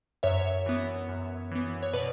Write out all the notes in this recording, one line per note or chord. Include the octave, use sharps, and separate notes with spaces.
F#2 C#5 E5
E3 B3
F#2
E3 B3
C#5
B2 B4 D5